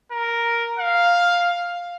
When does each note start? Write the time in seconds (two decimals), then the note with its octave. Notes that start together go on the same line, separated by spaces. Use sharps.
0.12 A#4
0.79 F5